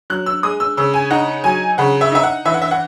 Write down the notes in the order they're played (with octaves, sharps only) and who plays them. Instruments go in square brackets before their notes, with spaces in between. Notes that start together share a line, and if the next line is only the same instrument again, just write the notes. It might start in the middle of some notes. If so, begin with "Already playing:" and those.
[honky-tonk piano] F#3 F#6
E6
G#3 D#6
E6
C#3 E6
G#5
D#4 F#5
F#3 G#5
C#3 F#5
E5
D#4 E5
F#5
E3 E5
F#5
E5
F#5